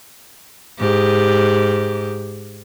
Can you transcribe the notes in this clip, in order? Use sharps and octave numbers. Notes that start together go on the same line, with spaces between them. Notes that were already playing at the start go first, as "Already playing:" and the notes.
G#2 G4